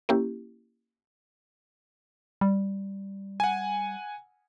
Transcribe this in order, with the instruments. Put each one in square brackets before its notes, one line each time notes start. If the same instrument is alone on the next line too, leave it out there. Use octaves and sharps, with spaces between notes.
[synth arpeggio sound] A#3 C#4 E4 G4
[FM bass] G3
[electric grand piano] F#5 G#5